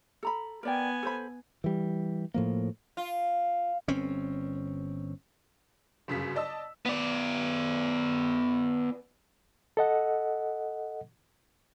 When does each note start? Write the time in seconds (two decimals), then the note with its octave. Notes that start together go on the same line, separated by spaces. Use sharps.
0.23 A4 A#5 B5
0.63 B3 A#4 D5 G5 G#5
1.03 A4 C5 B5
1.64 E3 G3
2.34 A2 F3 A#3
2.97 F4
3.88 G1 C4 C#4
6.08 G1 F#2 C#3 B6
6.36 D5 D#5 A5 E6
6.86 B3 D5
9.77 A4 D#5 F#5